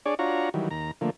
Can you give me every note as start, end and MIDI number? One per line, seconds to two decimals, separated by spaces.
0.06 0.15 62
0.06 0.15 68
0.06 0.15 73
0.06 0.15 74
0.19 0.49 62
0.19 0.49 65
0.19 0.49 66
0.19 0.49 73
0.19 0.49 82
0.54 0.69 51
0.54 0.69 52
0.54 0.69 54
0.54 0.69 55
0.71 0.91 39
0.71 0.91 82
1.01 1.10 50
1.01 1.10 53
1.01 1.10 57
1.01 1.10 58